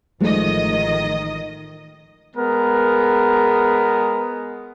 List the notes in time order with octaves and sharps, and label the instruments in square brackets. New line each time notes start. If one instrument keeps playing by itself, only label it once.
[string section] A1 D#3 D#5 [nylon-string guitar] F3 G#3 A3
[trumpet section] G#3 B3 A#4